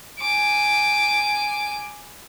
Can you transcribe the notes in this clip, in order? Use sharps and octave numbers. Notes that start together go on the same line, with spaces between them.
G#5 D6